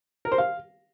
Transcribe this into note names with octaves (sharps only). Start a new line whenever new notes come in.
A#4
C5
F5